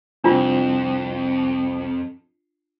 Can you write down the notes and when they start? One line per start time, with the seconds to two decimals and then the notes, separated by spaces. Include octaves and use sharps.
0.24 C2 F2 C4 D4 F4